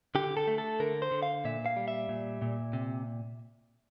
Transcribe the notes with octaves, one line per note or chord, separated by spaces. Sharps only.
D3 G4
A4
A3
A4
D3 A#4
C5
D3
F5
A#2 E5
F5
G3
E5
A#2
A#2
C3